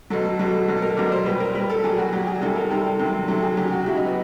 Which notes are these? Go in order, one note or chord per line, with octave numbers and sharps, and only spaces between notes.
B2 F#3 A4
A4
B2 F#3
A4
B2 F#3
A4
A#4
B2 F#3 D5
C5
A#2 G3 B4
A#4
A#2 G3 B4
A4
A#2 F#3 G#4
F#4
A#2 F#3 G4
G#4
C3 D#3 G3 A4
A#4
C3 D#3 G3 A4
C3 D#3 F#3
C3 D#3 F#3 A4
G#4
C#3 F#3 G4
F#4
C#3 F#3 E4
D#4
B3